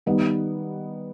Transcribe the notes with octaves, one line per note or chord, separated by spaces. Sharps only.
D#3 G3 B3 D#4